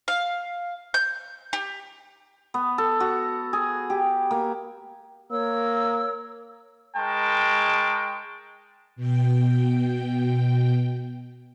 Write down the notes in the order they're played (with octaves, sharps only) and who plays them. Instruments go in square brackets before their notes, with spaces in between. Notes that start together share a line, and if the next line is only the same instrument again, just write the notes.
[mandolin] F5
G6
G4
[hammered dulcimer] B3
A4
F#4
G#4
G4
A#3
[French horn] A#3 [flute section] A#4 C#5 E6
[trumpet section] G#3 A#4 G5 A5 C#6
[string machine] B2 G5